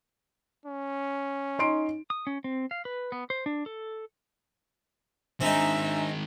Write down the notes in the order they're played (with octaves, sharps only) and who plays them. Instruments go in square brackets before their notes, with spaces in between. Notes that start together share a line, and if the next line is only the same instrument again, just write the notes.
[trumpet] C#4
[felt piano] D#4 C6 D7
[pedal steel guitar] D#6
C#4
C4
F5
B4
B3
C5
D4
A4
[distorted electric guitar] D#3 G#3 [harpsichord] C4 D#4 [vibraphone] D4 G#5 A#5 [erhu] E5